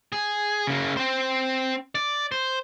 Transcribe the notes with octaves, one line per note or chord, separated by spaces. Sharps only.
G#4
C#3 A#3
C4 C5
D5
C5